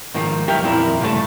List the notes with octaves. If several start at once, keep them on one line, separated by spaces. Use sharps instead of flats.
G#2 D#3 F3 A#3
D#2 F#3 G4 A#4 E5
F2 A#2 E4 A#4
C#2 G2 A#2 A3 A5